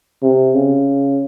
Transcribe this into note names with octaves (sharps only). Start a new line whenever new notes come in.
C3
C#3